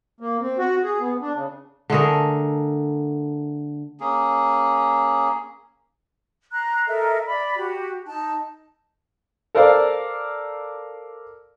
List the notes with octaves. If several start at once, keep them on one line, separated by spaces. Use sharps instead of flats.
A#3
C4
F#4
G#4
B3
D4
C#3
D3 A3 G#4 A#4
A#3 C#4 G#4
A#5 C6 F#6
A4 A#4 D#5 E5
D5 B5
F#4 G4
D#4 A5
A4 A#4 C5 D5 F5